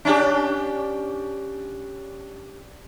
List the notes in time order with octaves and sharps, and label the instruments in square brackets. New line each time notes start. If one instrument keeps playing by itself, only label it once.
[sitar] C#4 D4 G4